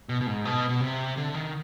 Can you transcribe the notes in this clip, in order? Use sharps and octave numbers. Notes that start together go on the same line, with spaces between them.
B2
B2
G#2
B2
B2
C3
D3
D#3